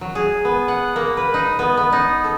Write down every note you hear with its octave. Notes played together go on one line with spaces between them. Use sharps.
F#3
G#4
B3
F#5
A#3
B4
D#4
B3
B3
D#4
A4